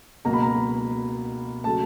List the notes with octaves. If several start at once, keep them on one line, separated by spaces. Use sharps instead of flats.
C#2 B2 F#3 A#3 A#5
B5
A#5
C#3 F#3 A3 A5